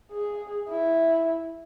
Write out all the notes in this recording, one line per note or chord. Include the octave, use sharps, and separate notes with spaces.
G#4
E4